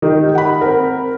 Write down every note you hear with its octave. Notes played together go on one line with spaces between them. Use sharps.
D#3 D#4 G4
F#5 B5
C4 A#4